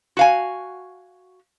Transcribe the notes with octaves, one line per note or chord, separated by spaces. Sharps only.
F#4 F5 G#5